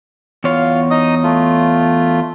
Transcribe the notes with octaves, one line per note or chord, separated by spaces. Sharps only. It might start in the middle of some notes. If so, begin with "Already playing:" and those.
E2 F4 C#5 F5
D#4 D#5 D#6
A3 F4